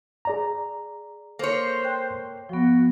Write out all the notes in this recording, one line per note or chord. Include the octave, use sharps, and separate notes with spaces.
G#4 D5 A#5
A#3 A4 C5 C#5
G5 F#6
F3 B3 F#4